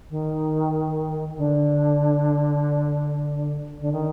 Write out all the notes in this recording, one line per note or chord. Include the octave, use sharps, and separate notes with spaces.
D#3
D3
D3
D#3